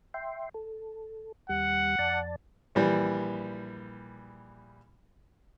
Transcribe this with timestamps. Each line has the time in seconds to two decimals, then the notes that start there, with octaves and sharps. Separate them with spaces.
0.14 E5 G5 C6
0.54 A4
1.49 D#2 G3 F#5
1.99 F2 D5 A5
2.75 A#1 E3 G3